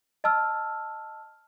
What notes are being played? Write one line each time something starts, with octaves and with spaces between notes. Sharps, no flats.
D#5 A5 E6 F6